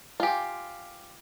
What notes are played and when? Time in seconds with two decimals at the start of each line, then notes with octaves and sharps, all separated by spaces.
0.20 F4 G4 F5 G#5 D6